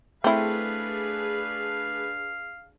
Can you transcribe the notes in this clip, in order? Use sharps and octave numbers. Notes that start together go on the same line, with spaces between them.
A3 C4 D4 E4 G#4 B4 F5